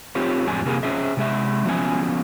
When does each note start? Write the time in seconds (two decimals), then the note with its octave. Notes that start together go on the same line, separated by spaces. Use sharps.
0.15 C4 F4 G4 C#5
0.47 F2 A2 G#3 D4 G#5
0.65 C3 A#3 F4 G#4
0.83 C#4 G#4 E5
1.17 C3 G#3 E5
1.65 F3 F#3 B3 C#4 G#5